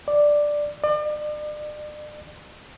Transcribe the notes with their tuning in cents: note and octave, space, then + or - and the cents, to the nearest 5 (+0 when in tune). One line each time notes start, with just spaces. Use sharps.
D5 +5
D5 +40